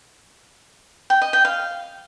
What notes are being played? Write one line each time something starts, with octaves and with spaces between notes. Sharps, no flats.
G5
D#5
G5
F5